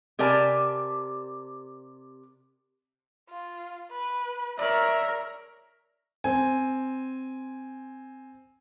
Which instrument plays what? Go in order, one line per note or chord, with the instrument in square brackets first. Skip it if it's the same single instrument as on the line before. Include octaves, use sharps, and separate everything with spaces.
[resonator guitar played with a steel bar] C3 G4 A#4 D5 G#5 A5
[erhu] F4
B4
[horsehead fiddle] A#4 [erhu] C#5 [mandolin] D5 [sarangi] E5
[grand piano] C4 G#5